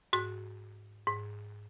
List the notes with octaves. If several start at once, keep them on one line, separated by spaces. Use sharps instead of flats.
G#2 F#4
G#2